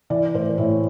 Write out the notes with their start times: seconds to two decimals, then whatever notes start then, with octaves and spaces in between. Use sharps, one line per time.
0.10 E3 D5
0.34 A2 C5
0.58 A2 C#5